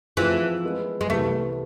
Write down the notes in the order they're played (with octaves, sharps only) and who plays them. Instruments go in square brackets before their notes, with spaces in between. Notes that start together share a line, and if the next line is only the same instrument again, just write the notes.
[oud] E3 [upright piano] F3 A3 C4 F4 G#4
[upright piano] E3 G#3 B3
[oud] G#3
[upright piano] C2 C3 E3 B3 [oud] A3